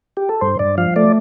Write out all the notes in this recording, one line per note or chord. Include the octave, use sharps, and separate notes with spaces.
G4
A4
G2 C5
G2 D5
F3 F5
A3 D5